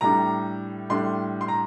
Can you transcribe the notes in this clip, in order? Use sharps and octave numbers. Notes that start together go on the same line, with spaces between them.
A2 G3 D4 A#5
A2 G3 D4 C6
C6
A#5